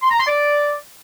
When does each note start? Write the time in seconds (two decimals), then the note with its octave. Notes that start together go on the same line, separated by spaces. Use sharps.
0.02 C6
0.11 A#5
0.19 C6
0.27 D5